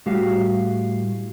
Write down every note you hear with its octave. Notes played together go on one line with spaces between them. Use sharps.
A2 G3 F#4 G4 F5